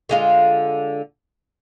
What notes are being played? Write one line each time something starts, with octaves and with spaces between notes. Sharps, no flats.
D3 G#3 F4